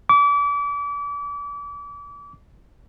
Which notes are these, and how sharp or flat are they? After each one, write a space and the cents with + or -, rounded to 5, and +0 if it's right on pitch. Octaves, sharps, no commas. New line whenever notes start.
D6 -35